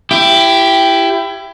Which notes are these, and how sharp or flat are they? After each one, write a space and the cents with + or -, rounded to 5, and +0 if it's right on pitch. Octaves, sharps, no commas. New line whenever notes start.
E4 +25 G4 +0